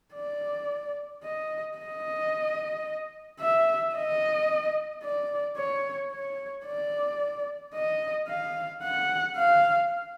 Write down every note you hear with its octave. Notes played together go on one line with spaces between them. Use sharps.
D5
D#5
D#5
E5
D#5
D5
C#5
C#5
D5
D#5
F5
F#5
F5